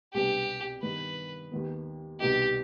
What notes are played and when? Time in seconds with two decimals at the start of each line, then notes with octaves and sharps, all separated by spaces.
0.14 C2 B2 G3 B3 D4 G4
0.82 G2 D#3 B3 B4
1.52 D#2 D#3 B3
2.20 C2 B2 B3 D#4 G4